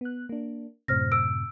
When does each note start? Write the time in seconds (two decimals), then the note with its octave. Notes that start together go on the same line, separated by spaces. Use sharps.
0.01 B3 F#6
0.29 A#3 D4
0.88 F#2 A2 C3 C5 F6 A#6
1.12 E6 D7